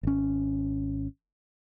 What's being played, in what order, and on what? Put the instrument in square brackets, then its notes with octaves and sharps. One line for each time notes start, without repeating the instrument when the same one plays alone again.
[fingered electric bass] G#1 C#4